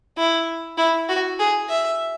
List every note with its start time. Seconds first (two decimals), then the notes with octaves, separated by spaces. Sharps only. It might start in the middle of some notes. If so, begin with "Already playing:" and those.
0.18 E4
0.78 E4
1.09 F#4
1.39 G#4
1.69 E5